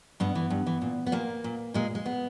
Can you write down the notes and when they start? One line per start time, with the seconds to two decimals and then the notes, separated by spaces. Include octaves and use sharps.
0.20 G2 B3
0.35 E3
0.50 G2
0.66 E3
0.82 A#2
1.06 B3
1.12 A#2 A#3
1.44 A#2
1.74 A#2 G#3
1.95 G#3
2.06 B3